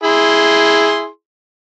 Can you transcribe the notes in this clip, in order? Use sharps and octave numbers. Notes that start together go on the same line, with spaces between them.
E4 G#4 C6